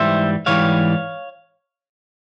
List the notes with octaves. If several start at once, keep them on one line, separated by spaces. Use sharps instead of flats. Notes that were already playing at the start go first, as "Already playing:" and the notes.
Already playing: G#2 E3 G3 C5 E5
G#2 E3 G3 C#5 F5